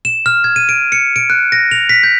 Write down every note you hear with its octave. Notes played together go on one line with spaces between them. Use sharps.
E7
F6
G#6
D#7
D7
C#7
D7
F#6
A#6
F7
B6
G6